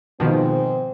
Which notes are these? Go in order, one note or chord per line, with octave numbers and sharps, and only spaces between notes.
G#2 B2 D#3 F3 C4